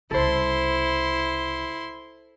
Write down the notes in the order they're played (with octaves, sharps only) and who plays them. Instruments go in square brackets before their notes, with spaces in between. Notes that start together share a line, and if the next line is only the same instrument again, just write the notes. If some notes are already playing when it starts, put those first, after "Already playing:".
[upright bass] C2 C#3 [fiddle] E4 C6 [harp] A4 C5